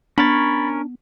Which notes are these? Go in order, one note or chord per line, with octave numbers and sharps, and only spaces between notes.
B3 C#4 D4 A#4 C#5 B5 A6